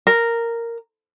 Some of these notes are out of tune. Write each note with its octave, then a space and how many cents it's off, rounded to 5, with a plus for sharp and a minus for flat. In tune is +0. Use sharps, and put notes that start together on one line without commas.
A#4 -5